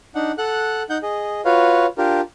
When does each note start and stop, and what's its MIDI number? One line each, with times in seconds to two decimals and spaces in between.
0.15 0.32 62
0.15 0.32 63
0.15 0.32 78
0.38 0.83 69
0.38 0.83 78
0.38 0.83 90
0.90 0.98 63
0.90 0.98 78
0.90 0.98 91
1.03 1.41 68
1.03 1.41 75
1.45 1.86 65
1.45 1.86 66
1.45 1.86 71
1.45 1.86 73
1.45 1.86 77
1.98 2.21 62
1.98 2.21 65
1.98 2.21 67
1.98 2.21 70